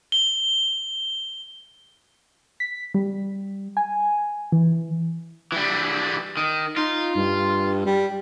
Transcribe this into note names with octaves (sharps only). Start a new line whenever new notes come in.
G7
B6
G3
G#5
E3
E3 G3
D#3
D#4 F4
G2
G3